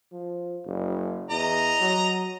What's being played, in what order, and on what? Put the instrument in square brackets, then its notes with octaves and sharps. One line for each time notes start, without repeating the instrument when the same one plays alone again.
[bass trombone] F3
F#1
[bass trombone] E2 [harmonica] D#5 A#5
[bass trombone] F#3